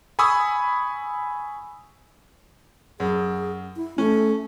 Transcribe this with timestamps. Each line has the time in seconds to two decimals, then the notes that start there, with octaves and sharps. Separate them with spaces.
0.19 G#5 B5 C#6 D#6 E6
3.00 F#2 G#4
3.76 E4
3.98 A3 C#4